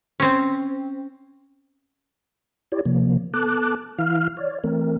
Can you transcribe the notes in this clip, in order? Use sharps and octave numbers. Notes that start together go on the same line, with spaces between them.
C4 C#4
E4 G4 C#5 D5
C3 F3 A#3
B3 A4 A5 D6 F#6
E3 E4 F5 F6
C#5 D5
E3 A3 C4 A#4